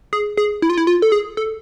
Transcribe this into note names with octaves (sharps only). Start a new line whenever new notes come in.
G#4
G#4
E4
F4
E4
F4
A4
G#4
A4